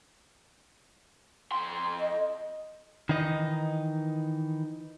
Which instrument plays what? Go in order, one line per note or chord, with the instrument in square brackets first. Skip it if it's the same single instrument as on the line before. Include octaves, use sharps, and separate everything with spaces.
[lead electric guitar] F2 C6
[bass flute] D#5
[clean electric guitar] D#3 E3 D#4 D#5